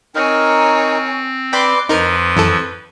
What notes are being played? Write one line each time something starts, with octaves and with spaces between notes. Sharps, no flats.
C4 D#4 A#4 C#5 G#5
B4 D5 G5 B5 C6 D6
F2 F3 D#4 A#4 B4 C6 F6
F#2 E3 A4